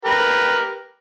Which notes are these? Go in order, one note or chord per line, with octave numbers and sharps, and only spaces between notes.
G4 A#4 B4